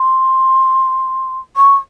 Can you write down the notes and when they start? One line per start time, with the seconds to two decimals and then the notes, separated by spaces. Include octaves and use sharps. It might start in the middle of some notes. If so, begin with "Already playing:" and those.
Already playing: C6
1.56 C#6